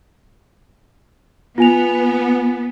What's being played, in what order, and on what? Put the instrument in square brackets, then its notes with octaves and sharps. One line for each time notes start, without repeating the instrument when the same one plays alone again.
[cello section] B3 [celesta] F4 G#5 F7